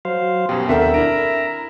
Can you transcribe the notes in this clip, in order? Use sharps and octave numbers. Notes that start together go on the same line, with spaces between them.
F#3 C5 F5
F#2 B2 G4
D#2 C4 D4 A4 A#4 E5 F#5 G5
D4 E4 A#4 A#5 D7